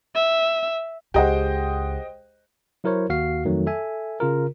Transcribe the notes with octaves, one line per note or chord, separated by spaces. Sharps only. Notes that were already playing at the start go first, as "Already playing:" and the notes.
E5
C#2 G4 G#4 C5 D#5 F#5 G5
F#3 E4 A#4 C5 C#5
D#2 F#4 F5 C7
F2 D#3 F#3 A3
A4 E5 G#5
C#3 F4 A#4